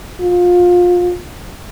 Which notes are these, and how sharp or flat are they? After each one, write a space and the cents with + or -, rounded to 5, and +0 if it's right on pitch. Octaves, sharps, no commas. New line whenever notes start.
F4 +25